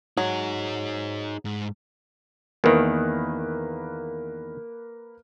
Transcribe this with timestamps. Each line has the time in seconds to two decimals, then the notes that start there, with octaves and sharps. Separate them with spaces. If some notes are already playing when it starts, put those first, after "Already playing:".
0.17 F#3 D#4 G#4
1.45 G#2
2.64 E2 D#3 A#3 A#4 B4